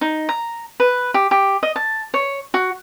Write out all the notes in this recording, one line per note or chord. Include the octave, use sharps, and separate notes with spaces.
D#4
A#5
B4
G4
G4
D#5
A5
C#5
F#4